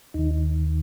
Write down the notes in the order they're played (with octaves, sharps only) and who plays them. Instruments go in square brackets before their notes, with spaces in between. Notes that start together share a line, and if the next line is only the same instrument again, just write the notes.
[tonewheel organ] D#2 D#3 D#4